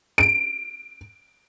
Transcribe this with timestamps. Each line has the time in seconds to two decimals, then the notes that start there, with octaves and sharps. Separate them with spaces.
0.18 D7